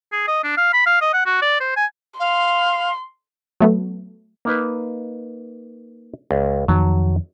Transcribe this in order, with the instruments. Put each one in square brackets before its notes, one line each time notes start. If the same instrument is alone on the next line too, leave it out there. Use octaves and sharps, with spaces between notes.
[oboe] G#4
D#5
D4
F5
B5
F5
D#5
F#5
F#4
D5
C5
G#5
[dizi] F5 [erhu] C6
[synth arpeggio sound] F#3 A3 B3
[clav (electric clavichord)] A#3 D#4 B4
C#2
[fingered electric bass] F2 D#3 [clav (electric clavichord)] F#3 A5